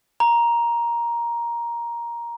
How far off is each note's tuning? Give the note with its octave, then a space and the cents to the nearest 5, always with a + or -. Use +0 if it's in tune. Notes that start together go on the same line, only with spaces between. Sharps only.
A#5 +10